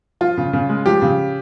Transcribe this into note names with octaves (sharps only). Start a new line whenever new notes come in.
F3 F4
C#3
C#3
G#3
F3 G4
C#3